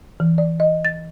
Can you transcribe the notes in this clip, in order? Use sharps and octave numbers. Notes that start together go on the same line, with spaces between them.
E3
D5
D#5
A6